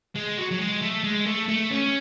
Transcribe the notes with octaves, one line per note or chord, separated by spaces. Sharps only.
G#3
F#3
F#3
G#3
A3
G#3
A3
A3
C#4